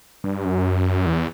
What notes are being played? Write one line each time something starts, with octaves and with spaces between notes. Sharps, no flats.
G2
F#2
E2